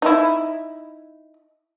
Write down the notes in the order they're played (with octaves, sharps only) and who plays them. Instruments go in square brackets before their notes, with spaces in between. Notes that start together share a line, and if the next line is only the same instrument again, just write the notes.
[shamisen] D#4 E4